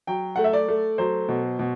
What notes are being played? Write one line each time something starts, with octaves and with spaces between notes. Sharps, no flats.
F#3 G5
A3 F#5
E5
D5
A3
F#3 C5
B2
B2